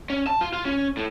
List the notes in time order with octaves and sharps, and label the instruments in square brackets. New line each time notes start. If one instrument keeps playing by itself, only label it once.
[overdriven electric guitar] C#4
A5
F4
F4
C#4
A2